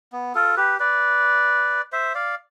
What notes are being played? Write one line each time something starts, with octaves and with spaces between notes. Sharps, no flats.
B3
F4 A4
G4 B4
B4 D5
C5 E5
D5 F5